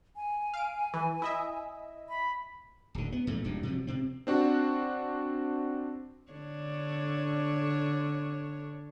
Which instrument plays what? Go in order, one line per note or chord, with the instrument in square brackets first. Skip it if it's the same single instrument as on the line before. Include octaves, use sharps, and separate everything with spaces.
[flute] G#5
[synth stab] F5 D7
E3
E4 D#5 E5
[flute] B5
[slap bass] D1 D3
B3
A#2 F3 G3 A3
E1 G2 A#2 E3
C3 F3 F#3
C3 C4
[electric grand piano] C4 D4 F#4
[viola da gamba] D3 D4 C#5